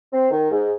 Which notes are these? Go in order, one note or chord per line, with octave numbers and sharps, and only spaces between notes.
C4
D#3
G#2